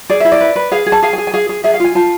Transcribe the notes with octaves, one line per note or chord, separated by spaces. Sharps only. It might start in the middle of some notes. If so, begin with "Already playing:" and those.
G#4 D5
E4 E5
D5
B4
B4
G#4 F5
G#4
A5
G#4 F5
G#4 G#5
G#5
G#4 F5
G#4
G#4 E5
F5
F4 G#5
F4 A5